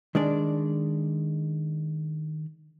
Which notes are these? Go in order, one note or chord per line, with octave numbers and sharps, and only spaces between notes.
D#3 G#3 D4 D5